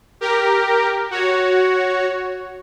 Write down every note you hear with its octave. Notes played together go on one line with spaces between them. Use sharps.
G4 A#4
F#4 C#5